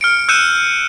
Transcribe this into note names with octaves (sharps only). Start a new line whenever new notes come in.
F6 C#7 D7
E6 F#6 G6 C#7 D#7 E7